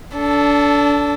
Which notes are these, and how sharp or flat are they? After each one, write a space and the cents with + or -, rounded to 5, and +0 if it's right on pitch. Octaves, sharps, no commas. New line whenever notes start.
D4 -25 A4 +0